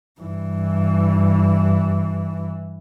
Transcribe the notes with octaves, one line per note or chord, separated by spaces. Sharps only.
G2 E3